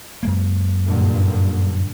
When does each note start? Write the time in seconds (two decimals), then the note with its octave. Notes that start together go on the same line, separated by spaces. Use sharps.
0.23 F#2 G#3 A#3
0.88 G2 A#2 D3